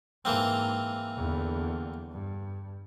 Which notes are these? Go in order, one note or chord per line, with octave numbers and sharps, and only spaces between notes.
G#2 E3 A#3 C4
E2 D3
G2